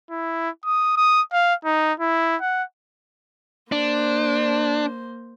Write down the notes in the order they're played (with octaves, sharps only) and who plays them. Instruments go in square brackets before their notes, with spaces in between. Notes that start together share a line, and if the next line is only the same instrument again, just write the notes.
[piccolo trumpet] E4
D#6
D#6
F5
D#4
E4
F#5
[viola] A#3 C5 [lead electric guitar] D4